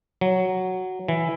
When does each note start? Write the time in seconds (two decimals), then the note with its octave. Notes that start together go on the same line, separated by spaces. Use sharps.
0.21 F#3
1.08 E3 E4